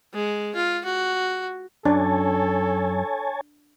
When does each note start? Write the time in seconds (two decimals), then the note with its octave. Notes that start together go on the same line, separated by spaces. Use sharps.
0.14 G#3
0.55 F4
0.85 F#4
1.85 F#2 D4 A4 C#5 G#5 A5